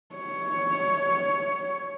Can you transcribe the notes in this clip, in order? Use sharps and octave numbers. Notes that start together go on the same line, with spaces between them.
C#5